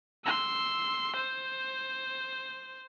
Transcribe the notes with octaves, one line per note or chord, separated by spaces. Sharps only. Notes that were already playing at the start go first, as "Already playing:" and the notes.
C6 E6
C5